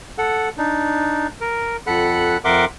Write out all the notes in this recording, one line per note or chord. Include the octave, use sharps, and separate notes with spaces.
A4 F#5
D4 D#4
A#4
F2 A4 F#5 B5 F#6
F2 A#4 E5 F#5 C6 D6